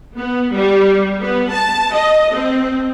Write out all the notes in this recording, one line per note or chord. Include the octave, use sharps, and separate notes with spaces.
B3
G3
B3
A5
D#5
C4